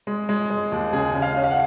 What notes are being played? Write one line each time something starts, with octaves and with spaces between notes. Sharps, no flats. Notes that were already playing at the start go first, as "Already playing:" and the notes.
G#3
G#3
G#3
D#2
C#3 G#4
C#3
F5
C#4
F5
F#5